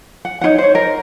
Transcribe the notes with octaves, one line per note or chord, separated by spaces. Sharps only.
F#5
D#4 F4 C#5 F#5
C5 C#5
A#4